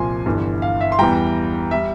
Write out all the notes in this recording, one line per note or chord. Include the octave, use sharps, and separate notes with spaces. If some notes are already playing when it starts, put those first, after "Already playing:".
Already playing: C2 A#2 F3 G#5 C6
G1 G2 E3
F5
E5
C6
E2 E3 G3 G5 A#5
G3 E5